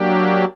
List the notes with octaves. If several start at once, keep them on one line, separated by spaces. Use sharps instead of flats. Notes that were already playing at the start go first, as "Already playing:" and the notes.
Already playing: F#3 A#3 D4 G4